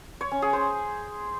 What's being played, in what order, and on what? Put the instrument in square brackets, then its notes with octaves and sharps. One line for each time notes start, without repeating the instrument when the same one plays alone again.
[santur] C#5
C#4
G#4
C5